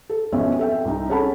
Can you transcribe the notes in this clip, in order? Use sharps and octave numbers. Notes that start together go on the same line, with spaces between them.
A4
B1 F2 B2 C4 C#4 E5
A4 E5 G5
C2 C4 D#4
C#4 G#4 A4 F#5 A5 B5